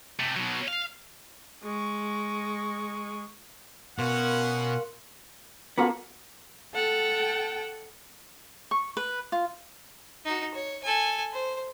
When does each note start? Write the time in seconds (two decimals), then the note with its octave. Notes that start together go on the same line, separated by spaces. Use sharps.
0.19 C3 A3
0.36 B2 F#3
0.68 F5
1.64 G#3 C#6
3.99 B2 C#4 A#4 F5 F#5 C6
5.78 A#3 B3 C#4 F4 F#4 A4
6.74 A4 F#5 G5 A5
8.71 C#6
8.97 B4
9.32 F4
10.25 D#4 F#4
10.54 C#5
10.83 A4 G#5
11.33 C5